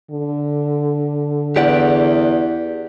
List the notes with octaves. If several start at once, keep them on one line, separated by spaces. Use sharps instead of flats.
D3
E2 G4 D5 F#5